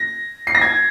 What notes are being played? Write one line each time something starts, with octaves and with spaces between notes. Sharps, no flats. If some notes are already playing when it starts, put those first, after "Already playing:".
Already playing: A#6
C7
A#6
G#6